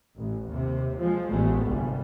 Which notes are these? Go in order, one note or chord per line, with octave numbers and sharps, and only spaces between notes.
A1
D#2 C3
F3 G#3
A1 G#3 A3 B3
G1 C2 G3